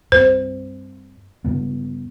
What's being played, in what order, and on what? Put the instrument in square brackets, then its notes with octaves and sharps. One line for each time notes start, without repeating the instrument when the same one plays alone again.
[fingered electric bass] G2 C4 [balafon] C5
[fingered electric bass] G2 C#3 B3